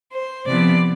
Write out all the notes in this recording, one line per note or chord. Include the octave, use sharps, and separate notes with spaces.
C5
C3 F3 B3 E4 D5